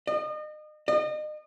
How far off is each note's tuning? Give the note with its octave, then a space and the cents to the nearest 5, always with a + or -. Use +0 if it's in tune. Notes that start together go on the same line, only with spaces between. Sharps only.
D#5 -35
D#5 -35